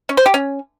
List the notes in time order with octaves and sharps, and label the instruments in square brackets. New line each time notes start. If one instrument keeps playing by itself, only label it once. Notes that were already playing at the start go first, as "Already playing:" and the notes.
[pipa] C#4
C5
G4
C#4